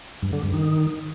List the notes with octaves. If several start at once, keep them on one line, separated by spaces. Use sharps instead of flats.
G2
D3
G2
D#3